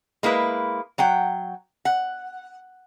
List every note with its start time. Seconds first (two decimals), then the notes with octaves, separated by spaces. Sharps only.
0.23 G#3 A#3 E4 B4
0.98 F#3 F#5 G5
1.85 F#5